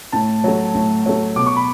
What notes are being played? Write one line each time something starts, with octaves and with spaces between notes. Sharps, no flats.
A2 A5
F#3 A3
A2
F#3 A3
B2 D6
C#6
B5